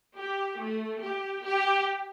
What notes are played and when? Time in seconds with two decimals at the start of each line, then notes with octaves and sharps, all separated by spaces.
0.17 G4
0.59 A3
1.02 G4
1.44 G4